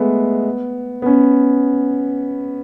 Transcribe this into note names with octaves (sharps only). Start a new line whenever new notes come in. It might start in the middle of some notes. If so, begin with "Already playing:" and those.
Already playing: G#3 A3 B3
B3
C#4